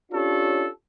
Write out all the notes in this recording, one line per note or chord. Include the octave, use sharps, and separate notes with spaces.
C#4 D4 F4 G4 A4 C#5